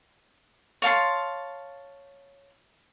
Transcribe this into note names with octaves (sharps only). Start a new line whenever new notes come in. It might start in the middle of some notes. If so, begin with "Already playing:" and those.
C#5 F5 A5 C6